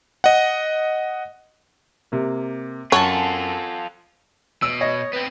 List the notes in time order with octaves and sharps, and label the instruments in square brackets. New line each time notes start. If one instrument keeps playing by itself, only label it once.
[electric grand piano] D#5 F#5
[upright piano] C3 A#3
[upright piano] F#2 [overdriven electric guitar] F4 A4 [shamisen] C#5 [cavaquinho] F#5 G#5 A5
[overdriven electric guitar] B2 [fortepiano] E6
[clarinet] C#5 [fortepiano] D#5
[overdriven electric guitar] B3 C4 [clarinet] B4